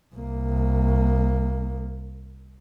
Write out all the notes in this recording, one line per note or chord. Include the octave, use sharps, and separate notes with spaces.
C2 A#3